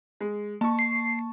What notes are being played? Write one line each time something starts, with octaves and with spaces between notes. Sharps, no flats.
G#3
A#3 A5 C#6
C7